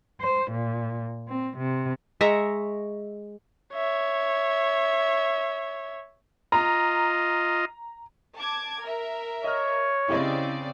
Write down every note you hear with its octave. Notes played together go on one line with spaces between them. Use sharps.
C5
A#2
C4
C3
G#3 E5 A#5 C#6
C#5 E5
F4 D#5 A#5
A5 D6 G#6
A#4 E5
C#5 D#5 F6
C#3 C4 E4 G4 D5 D#5